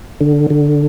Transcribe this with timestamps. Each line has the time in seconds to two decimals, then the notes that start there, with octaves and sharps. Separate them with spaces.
0.21 D3
0.50 D3